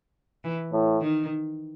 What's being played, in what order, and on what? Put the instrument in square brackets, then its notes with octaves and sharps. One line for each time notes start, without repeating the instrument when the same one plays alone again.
[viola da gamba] E3
[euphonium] A2
[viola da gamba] D#3